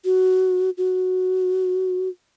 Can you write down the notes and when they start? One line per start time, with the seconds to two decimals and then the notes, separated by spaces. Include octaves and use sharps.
0.05 F#4
0.78 F#4